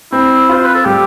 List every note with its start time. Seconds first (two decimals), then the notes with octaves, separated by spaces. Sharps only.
0.12 C4 E4
0.49 F4 C5
0.64 B4
0.74 A4
0.85 G3 G4